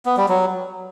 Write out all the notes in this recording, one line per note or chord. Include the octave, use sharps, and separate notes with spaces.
B3
G3
F#3